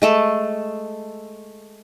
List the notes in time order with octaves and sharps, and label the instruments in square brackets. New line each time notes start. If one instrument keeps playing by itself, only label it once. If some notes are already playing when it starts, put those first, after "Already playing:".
[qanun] G#3 A3 A4